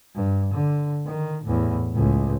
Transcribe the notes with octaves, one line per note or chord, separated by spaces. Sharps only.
G2
D3
D#3
E2 A2
C#2 A2